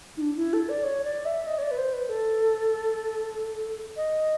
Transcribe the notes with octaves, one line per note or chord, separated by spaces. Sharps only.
D#4
D4
E4
A4
D5
C#5
D5
E5
D#5
C#5
D5
B4
C5
B4
A4
D#5